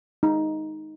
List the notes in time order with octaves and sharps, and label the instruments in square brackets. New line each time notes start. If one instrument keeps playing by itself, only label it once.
[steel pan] D#4